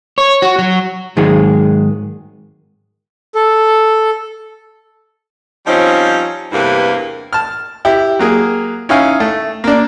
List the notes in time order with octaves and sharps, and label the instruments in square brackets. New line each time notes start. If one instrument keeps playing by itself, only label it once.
[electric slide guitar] C#5
F#4
F#3
[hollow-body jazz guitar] G#2 D#3 F#3 G#3 A#3 G#4
[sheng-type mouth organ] A4
[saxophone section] F3 G3 C4 C#4 D#4 F4
E2 G2 C3 A#3 E4 B4
[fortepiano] A5 F6
E4 G4
F#3 A#3 G#4
C#4 D#4 E4 F5 G#5
A3
A#3 D4